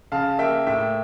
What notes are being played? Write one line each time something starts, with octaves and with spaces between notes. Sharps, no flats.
C#3 F5 A5
A#3 E5 G5
A2 E5 G5